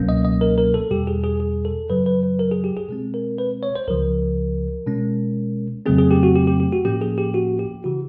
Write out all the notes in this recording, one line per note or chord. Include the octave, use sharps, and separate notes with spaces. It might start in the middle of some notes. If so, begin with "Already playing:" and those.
Already playing: C#2 B2 F#3 A#3 C#4
D#5
D#5
A#4
A#4
A4
E2 B2 G3 G4
G#4
G#4
G#4
A4
F#2 C#3 F#3 B4
B4
B4
A#4
G#4
G4
G#4
B2 G#3 C4
A#4
B4
C#5
C5
C#2 C#3 F3 A#4
B2 G#3 C#4
F2 C#3 F#3 A3 C4 G#4
G#4
G4
F#4
G4
G4
G4
F#4
A2 F3 A#3 C#4 G4
G#4
G4
F#4
G4
C#3 E3 F#4